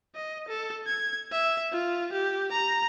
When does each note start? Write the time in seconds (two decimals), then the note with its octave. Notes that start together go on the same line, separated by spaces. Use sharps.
0.15 D#5
0.48 A4
0.86 G#6
1.31 E5
1.72 F4
2.12 G4
2.52 A#5